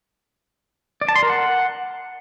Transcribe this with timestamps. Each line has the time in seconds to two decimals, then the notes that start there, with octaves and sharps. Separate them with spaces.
1.01 D5
1.09 A5
1.16 C6
1.23 A#4
1.30 F#5